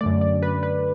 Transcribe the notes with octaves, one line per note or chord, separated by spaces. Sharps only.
F#2 D3 A3 D5
D5
B4
B4